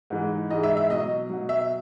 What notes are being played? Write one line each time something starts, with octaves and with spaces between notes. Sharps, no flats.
G#2 E3 G#3
G#2 E3 G#3 D#5
E5
E5
B2 F#3 D#5
B2 F#3
E5